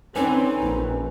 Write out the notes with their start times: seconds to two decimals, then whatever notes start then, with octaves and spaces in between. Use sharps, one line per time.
0.16 D3 C4 C#4 D#4 B4 G#5
0.59 A#1